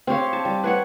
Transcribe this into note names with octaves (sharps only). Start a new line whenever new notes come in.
C4 G4 C#5 F5
A5
G3
B4 C#5 F#5